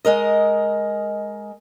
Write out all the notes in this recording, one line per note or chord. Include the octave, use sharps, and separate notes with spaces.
G#3 A#4 D#5